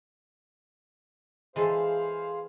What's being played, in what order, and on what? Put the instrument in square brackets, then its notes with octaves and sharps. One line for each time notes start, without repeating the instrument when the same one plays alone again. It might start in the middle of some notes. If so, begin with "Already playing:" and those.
[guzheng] E3 G#3 A4 [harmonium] G#4 C5 F5